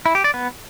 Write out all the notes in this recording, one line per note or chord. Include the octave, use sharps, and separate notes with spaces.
E4
G4
D5
B3